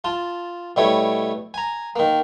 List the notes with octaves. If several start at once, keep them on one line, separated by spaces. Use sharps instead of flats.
F4 A5
B2 G3 A3 E4 C#5
G#5 A#5
D#3 A#3